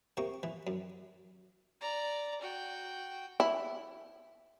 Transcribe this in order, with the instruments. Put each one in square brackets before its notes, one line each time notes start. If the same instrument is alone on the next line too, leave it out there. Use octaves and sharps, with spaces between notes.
[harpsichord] C3 A#3 C#6
E3
F#2
[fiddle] D5 A#5
F#4 G5
[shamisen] E4